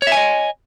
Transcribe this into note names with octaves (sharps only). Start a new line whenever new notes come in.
C#5 D#5 E5 G#5